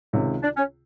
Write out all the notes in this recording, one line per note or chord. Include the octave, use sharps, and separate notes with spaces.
C#2 C3 D#3 G#3 C#4
D4
C#4